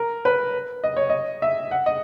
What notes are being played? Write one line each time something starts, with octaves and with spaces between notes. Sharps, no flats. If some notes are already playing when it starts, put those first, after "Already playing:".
Already playing: A#4
B4
D#5
C#5
D#5
E5
F#5
D#5